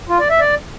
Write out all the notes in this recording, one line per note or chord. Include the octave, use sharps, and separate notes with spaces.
F4
D5
E5
D5